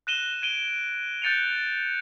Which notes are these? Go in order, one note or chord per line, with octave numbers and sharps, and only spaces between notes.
F#6 A#6 D#7 E7 G7
G#6 D7 D#7 G7
F#6 G6 A6 C#7 D#7 F7